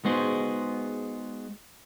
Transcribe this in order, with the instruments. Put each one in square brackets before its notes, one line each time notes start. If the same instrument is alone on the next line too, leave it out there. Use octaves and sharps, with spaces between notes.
[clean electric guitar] G#3 B3 D#4 F#4 G#4 C5